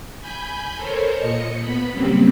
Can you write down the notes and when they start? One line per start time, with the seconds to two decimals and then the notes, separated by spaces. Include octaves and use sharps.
0.20 G#5 B5 G6
0.75 A4 A#4 C5 C#5
1.17 A#2 D#5 C#7
1.60 B3 B5
1.92 C#3 F#3 G3 A#3 C4